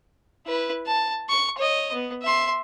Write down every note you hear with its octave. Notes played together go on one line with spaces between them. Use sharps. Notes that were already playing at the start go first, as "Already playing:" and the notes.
E4 B4
A5
C#6
C#5 D#5
B3
E5 C6